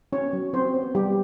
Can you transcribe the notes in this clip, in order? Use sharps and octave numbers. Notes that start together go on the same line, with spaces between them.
B3 C#4 C#5
F#3
F#3 C4 C5
B3
G3 B3 G4